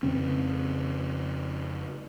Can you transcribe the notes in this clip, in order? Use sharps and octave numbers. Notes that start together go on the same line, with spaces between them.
F2 C#3 C4